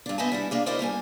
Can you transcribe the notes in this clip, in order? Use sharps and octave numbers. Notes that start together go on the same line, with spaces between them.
G2 D4
B3 C5 D#5 E5 G#5 A5
G3 D4 E4
A#3 D4 G#4
E4 A#4 C5 D5 D#5
G3 A#3 D4 G#5